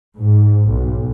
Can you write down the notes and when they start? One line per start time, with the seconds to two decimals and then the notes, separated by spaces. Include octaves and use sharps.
0.16 G#2
0.70 B1